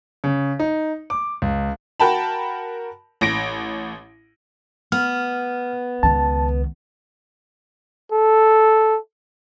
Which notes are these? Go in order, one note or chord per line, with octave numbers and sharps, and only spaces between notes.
C#3
D#4
D6
C#2
F#4 A#4 G5 A5 B5
A1 A#6 D7
B3 F6
C#2 D#3 A5
A4